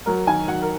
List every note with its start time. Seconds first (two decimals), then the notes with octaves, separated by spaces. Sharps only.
0.06 F#3 A#4
0.27 D#3 G#5
0.48 F#3 F#5
0.62 A#4